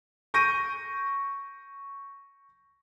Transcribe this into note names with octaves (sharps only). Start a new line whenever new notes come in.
C#6 G6 A#6 D7 D#7